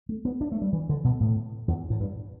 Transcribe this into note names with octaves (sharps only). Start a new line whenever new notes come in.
A3
B3
D4
A3
G3
E3
D3
B2
A2
E2
A2
G2